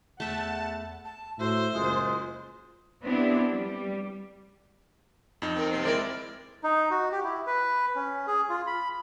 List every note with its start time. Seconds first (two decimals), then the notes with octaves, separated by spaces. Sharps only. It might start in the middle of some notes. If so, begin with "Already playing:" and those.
0.20 E2 A3 E5 F#5 A5
1.05 A5
1.40 A2 F#4 C5 E5
1.74 F#1 G#3 F4
3.03 B3 C4 D4 E4 G4
3.52 G3
5.42 F2 D#4
5.56 C4 A#4
5.72 C3 A#3 C4
5.85 G#3 C4 E4 A#4 D5
6.64 D#4
6.91 F#4
7.12 G4
7.24 E4
7.47 B4
7.96 C#4
8.27 G#4
8.50 F4
8.67 B5